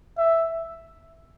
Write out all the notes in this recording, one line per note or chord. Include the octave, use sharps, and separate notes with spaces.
E5